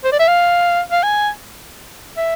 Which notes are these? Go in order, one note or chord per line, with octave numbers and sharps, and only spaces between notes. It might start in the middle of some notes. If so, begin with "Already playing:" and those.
C5
D5
E5
F5
F5
G#5
E5